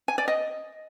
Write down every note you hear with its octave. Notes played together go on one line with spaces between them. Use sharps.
G#5
D5
D#5